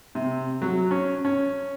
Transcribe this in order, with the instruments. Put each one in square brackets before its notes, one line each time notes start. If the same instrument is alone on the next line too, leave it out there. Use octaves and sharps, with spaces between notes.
[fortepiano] C3
F#3
C#4
C#4